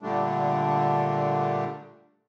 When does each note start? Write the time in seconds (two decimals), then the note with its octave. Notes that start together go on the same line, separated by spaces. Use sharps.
0.02 A#2 D3 G3 A3 D4